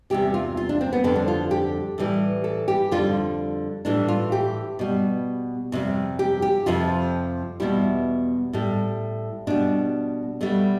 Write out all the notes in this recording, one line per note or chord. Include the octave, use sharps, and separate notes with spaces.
E2 C3 G3 G4
F4
F4
D4
C4
B3
F2 D3 G3 C4
D4
F4
G4
A2 E3 G3
A4
G4
F2 D3 G3 F4
A2 E3 G3 D4
F4
G4
B2 G3
F2 C3 G3
G4
G4
F2 C3 F3 F4
E2 B2 G3 E4
A2 G3
B2 G3 D4
B2 G3 A3